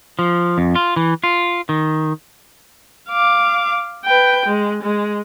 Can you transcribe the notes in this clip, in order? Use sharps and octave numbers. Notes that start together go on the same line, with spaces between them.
F3
F2
F4
E3
F4
D#3
F5 D6
B4 G5
G#3
G#3